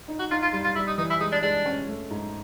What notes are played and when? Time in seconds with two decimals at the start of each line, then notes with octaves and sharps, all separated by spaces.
0.08 D#4
0.19 F#4
0.31 D#4 F4
0.42 F4
0.53 G3 F4
0.64 F4
0.75 G3 E4
0.87 D#4
0.98 E3 D#4
1.10 E4
1.20 G#3 D#4
1.32 D4
1.43 G#3 D4
1.66 C#4
1.88 A3
2.11 G#2